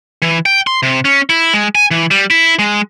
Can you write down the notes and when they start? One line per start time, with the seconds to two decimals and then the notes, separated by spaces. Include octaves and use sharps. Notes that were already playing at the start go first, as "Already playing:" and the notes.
0.22 E3
0.46 G5
0.67 C6
0.83 C3
1.05 C#4
1.29 E4
1.53 G#3
1.75 G#5
1.91 E3
2.11 G3
2.30 E4
2.59 G#3